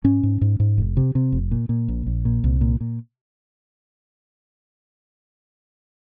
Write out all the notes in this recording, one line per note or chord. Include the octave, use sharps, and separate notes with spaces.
G#2 C#4
G#2
G#2
G#2
F1
C3
C3
F1
A#2
A#2
A#1
A#1
A#2
C2
A#2
A#2